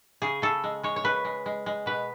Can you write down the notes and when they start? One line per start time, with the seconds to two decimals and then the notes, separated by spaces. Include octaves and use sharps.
0.22 C#3 G#4
0.42 C#3 A4
0.64 G#3
0.83 G#3 C#5
0.96 C#5
1.04 C#3 B4
1.25 G#3
1.46 G#3
1.66 G#3
1.86 B2 B4